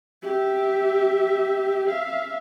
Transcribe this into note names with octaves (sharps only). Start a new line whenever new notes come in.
G4 E5
E5 F5